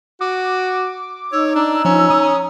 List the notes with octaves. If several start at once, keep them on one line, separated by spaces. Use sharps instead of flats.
F#4 D6
D#4 C#5 E6
D4 A#5
F3 C#4
D#6